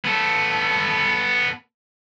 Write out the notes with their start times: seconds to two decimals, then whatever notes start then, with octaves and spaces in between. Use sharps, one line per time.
0.05 B3 A4